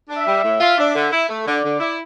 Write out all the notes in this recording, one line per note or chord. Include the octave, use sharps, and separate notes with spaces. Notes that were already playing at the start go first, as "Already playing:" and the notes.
D4
E5
G3
A2
F4
D4
D3
E4
A3
D3 D5
D3
E4